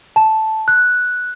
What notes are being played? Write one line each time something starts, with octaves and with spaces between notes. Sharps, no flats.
A5
F#6